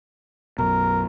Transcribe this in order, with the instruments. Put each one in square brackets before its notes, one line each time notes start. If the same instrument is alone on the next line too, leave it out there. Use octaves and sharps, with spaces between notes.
[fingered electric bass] B1 F#2 B2 [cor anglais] A#4